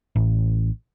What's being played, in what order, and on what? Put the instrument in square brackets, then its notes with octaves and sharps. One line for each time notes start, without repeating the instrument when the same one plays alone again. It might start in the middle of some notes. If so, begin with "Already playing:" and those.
[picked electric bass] A1